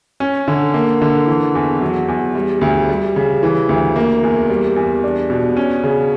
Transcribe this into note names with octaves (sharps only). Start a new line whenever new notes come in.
C#4
D3
A#3
D3
E3
E2
F#3
E2
G3
D2
G3
C#3
E3
D2
A#3
E2
G3
E2
D4
B2
C#4
C#3